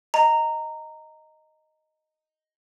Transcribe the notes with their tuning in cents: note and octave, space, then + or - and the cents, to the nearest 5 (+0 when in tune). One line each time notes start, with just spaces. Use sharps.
D#5 +0 A#5 -15